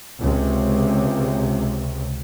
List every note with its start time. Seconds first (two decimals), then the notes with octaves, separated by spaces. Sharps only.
0.20 C#2 C3